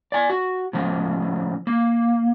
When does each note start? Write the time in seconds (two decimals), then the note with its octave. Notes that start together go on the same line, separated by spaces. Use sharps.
0.12 D5 G#5
0.30 F#4
0.73 A2 C#3 F3
1.67 A#3